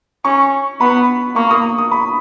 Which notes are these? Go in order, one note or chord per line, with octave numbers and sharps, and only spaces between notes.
C#4 C#6
B3 B5
A#3 C#6
D#6
D#6
B5